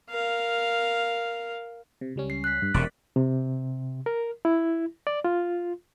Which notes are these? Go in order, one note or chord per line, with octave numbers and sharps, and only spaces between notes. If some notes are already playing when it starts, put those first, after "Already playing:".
A#4 F5
C3
C#2 G3 C#4
C7
F#6 B6
G2
E1 C3 A#4 D5 B5
C3
A#4
E4
D5
F4